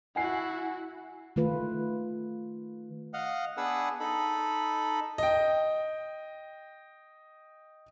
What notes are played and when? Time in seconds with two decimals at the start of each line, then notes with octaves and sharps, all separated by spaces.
0.16 E4 F#4 F#5 G#5 C7
1.36 D#3 A3 F4 B4
3.13 D#5 F5 F#5
3.57 B3 D4 G#4 B4 F#5 E6
4.00 D#4 A4 B5
5.18 D#5 G5